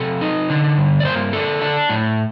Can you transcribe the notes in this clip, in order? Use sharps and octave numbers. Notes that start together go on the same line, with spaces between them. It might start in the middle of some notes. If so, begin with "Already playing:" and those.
Already playing: C3 A4
D#4
D3
G2
D5
A#3 C5
D4 A4
D4
A2